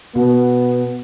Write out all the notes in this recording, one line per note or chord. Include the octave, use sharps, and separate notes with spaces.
B2 B3